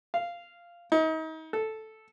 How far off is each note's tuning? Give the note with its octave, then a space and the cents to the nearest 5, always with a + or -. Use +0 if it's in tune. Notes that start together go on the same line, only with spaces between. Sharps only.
F5 -10
D#4 +35
A4 -5